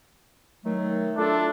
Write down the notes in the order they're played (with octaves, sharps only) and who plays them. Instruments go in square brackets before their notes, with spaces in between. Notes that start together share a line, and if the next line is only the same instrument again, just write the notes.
[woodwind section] D#3 F#3 A3
[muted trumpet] D4 [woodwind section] E4 F4 A4